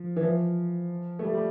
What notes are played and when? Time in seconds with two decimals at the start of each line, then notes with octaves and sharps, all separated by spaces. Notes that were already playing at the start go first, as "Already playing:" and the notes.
Already playing: F3
0.16 E3
0.23 F3
1.19 A3
1.23 G3
1.34 G3